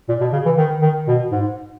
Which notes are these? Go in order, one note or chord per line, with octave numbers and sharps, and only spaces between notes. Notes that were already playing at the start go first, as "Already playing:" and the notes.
A#2
B2
C#3
E3
D#3
D#3
B2
G#2